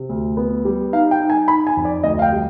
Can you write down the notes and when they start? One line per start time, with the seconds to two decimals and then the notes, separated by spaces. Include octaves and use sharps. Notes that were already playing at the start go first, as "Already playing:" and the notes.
Already playing: C3
0.09 D2
0.37 B3
0.65 G3
0.93 D#4 F5
1.11 G5
1.20 D#4
1.30 G#5
1.48 D#4 B5
1.67 G#5
1.77 F2
1.85 D5
2.03 D2 D#5
2.19 F5
2.22 G5
2.32 G3